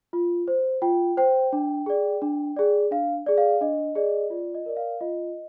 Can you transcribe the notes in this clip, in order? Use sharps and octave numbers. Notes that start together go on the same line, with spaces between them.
F4
C5
F4 G5
C5 G5
D4
G#4 D5
D4
G#4 D5
D4 F5
G#4 D5
F5
D4 D#5
G#4 D5 D#5
F4 D5
D#5
A#4 D5
F5
F4 D#5